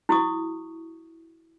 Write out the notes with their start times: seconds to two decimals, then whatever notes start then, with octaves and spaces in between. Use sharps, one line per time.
0.09 E4 F#4 C#6 D#6